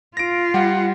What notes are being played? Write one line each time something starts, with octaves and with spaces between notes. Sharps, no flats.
F4 A#6 D7
G3 F#5